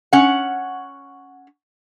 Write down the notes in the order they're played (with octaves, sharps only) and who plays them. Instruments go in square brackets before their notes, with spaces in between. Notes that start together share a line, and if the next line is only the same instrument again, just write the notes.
[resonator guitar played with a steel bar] C#4 F#5